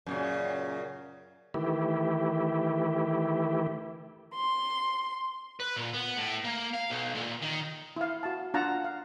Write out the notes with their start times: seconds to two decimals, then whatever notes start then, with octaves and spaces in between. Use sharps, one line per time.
0.06 F#2 A#2 C#3
1.54 D#3 E3 A3 E4 G4
4.35 C6
5.60 B4
5.76 A#2
5.93 B3
6.17 A2
6.45 A#3
6.74 F5
6.90 B1
7.15 A#2
7.42 D#3
7.96 E4 F5
8.23 F#4 A5
8.54 D4 F4 F5 F#5 A5 A#5
8.84 F5